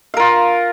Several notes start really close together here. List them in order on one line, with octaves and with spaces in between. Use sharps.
F5 A#4 F4